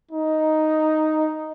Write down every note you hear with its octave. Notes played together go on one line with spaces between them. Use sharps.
D#4